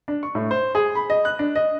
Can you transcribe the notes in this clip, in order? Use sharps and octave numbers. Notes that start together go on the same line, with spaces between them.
D4
C#6
A2
C5
G#4
B5
D#5
F#6
D4
D#5